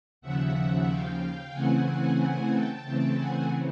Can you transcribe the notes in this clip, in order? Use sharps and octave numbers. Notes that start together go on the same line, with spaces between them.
D#2 C#3 F3 E5 F#5
F5 G5
C#3 E3 A3 C4 F#5 G#5
F#5 G#5
G5 A5
C#3 E3 A3 C4
F#5 G#5